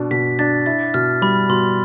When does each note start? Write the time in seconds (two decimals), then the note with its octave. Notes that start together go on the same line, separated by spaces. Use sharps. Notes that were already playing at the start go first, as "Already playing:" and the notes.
Already playing: B2 D4
0.11 B2 B6
0.39 D4 A6
0.66 E4 A6
0.94 B2 F6
1.22 G3 B5
1.49 B2 C6